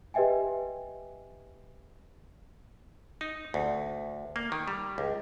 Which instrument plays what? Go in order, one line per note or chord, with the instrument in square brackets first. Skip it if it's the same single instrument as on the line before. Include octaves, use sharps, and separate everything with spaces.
[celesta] G4 B4 D#5 E5 G5 G#5
[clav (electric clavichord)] D#4
D2
A#3
D#3
G3
C#2